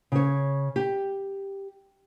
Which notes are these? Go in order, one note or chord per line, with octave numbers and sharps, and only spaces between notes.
C#3 C#5
G4